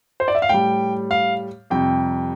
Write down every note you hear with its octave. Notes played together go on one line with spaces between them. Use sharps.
C5
D5
E5
F5
A2 G3 G5
F5
F2 C3 G3 G5